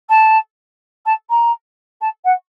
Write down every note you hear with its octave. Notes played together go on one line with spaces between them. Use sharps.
A5
A5
A#5
A5
F#5